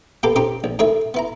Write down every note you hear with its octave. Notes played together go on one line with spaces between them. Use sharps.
A#3 B3 G4 A4
C4 C#4 D#4 G4
A#1
A2 D#3 G#4 C#5 E5
B3 E4 A#5